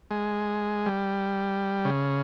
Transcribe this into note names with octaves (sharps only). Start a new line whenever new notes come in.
G#3
G3
C#3